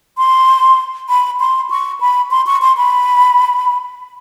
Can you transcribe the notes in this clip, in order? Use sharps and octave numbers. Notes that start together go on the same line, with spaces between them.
C6
B5
C6
C#6
B5
C6
C#6
C6
B5